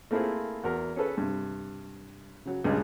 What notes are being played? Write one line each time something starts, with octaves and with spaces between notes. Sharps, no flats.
A3 A#3 C4 E4 F4 G#4
E2 F#4 A#4
C#4 G#4 A4 B4
G2 C3
C#3 F#3
C#2 G2 A#2 C#3 G#3